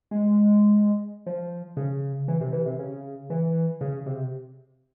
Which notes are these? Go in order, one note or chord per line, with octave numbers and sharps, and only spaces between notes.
G#3
F3
C#3
E3
C3
E3
C3
C#3
E3
C#3
C3